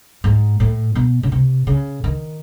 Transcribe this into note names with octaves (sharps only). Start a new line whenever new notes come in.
G#2
A2
B2
C#3
C3
C#3
D#3